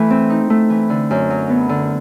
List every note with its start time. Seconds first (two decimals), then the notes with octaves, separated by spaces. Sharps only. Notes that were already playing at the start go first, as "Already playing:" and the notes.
Already playing: E3 A3
0.10 C4
0.30 D#4
0.50 A3
0.70 E3
0.90 D3
1.11 F#2
1.30 F#3
1.49 B3
1.69 D3